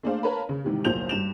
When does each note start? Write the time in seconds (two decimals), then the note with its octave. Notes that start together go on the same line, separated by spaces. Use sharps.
0.03 A3 A#3 D4 G#4 C5 F5
0.23 A#4 B4 C#5 F5 A5 B5
0.49 C#3
0.64 G#2 C3 D#3 E3 G3
0.85 F#1 B1 F3 C5 G6 F7
1.09 G2 E7 F7